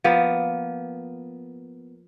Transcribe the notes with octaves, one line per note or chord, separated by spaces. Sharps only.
F3 A#3 B3